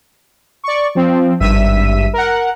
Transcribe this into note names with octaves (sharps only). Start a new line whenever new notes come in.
D5 C#6
F3 C4
G#1 G2 E5 E6 B6 D#7
A#4 F#5